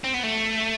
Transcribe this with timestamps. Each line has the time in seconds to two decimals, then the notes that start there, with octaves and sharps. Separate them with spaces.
0.04 C4
0.14 B3
0.23 A3